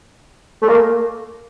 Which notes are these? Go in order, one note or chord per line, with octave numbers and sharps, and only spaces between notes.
A3
A#3